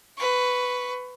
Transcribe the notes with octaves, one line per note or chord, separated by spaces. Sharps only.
B4 C#6